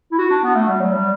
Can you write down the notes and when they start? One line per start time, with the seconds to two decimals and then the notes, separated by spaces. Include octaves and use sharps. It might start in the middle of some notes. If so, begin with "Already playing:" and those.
0.12 E4
0.19 F#4
0.31 D4
0.44 B3
0.55 A3
0.68 G3
0.81 F#3
0.93 G3